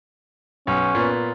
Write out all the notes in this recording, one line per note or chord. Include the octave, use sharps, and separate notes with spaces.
B1 C#4
A#2 B3